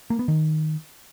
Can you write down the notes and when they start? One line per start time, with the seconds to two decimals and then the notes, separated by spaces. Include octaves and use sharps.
0.10 A#3
0.19 B3
0.28 D#3